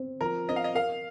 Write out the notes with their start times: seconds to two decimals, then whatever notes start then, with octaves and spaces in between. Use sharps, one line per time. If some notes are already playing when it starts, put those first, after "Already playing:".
Already playing: C4
0.21 F3 A#4
0.48 C4 D#5
0.56 F5
0.64 D#5
0.75 A#4 F5